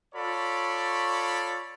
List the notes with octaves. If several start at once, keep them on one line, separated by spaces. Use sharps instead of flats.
F4 A4 C#5 D5 B5 C#6